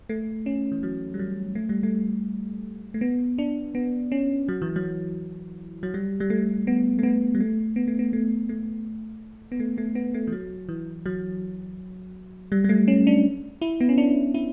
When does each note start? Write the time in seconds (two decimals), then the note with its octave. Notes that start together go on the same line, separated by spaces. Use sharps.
0.09 A3
0.46 C#4
0.72 E3
0.83 F#3
1.14 G3
1.19 F#3
1.55 A3
1.69 G3
1.83 A3
2.94 A3
3.01 B3
3.38 D4
3.75 B3
4.12 C#4
4.49 F#3
4.62 E3
4.76 F#3
5.83 F#3
5.94 G3
6.20 G3
6.30 A3
6.67 B3
6.99 A3
7.03 B3
7.35 G3
7.40 A3
7.76 B3
7.88 A3
7.99 B3
8.13 A3
8.49 A3
9.52 B3
9.60 A3
9.78 A3
9.95 B3
10.14 A3
10.27 E3
10.32 F#3
10.69 E3
11.06 F#3
12.52 G3
12.64 G3
12.69 A3
12.88 C#4
13.07 D4
13.62 E4
13.80 B3
13.89 C#4
13.98 D4
14.34 E4